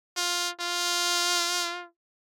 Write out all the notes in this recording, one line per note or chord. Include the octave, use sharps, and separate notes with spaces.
F4
F4